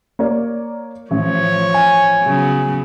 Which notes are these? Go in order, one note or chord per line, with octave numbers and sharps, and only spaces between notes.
A#3 C#5 D5
A1 F3 C#5
G#5
C#3 F#3 B3